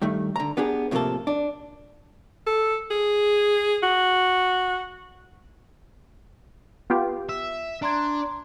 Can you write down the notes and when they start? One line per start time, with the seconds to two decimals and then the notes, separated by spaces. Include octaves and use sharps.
0.02 G2 D#3 A3
0.36 D3 A#5
0.57 B3 D4 G4 G#4
0.91 A2 C3 F3 A3 A#3 A4
1.27 D4
2.47 A4
2.91 G#4
3.83 F#4
6.90 B3 F4 G4
7.29 E5
7.82 D4 A#5 C6 G#6